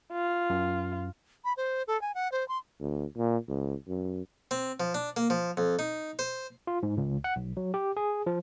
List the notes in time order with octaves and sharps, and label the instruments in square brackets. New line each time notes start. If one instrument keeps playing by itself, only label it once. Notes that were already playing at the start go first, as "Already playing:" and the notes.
[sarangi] F4
[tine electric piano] F#2
[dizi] B5
C5
A4
G#5
F#5
C5
C6
[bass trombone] D2
A#2
C#2
F#2
[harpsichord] C4
F3
D4
A#3
F3
F2
D#4
C5
[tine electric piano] F4
G#2
C#2
F#5
B1
F#3
G4
G#4
F3